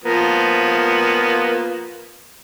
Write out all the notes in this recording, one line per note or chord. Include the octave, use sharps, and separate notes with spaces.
F3 A#3 B3